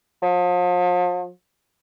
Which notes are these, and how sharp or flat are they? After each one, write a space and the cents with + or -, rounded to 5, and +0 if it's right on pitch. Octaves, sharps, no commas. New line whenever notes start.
F3 +40